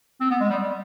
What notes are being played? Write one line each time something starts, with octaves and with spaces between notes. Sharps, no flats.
C4
B3
G#3
G3
G3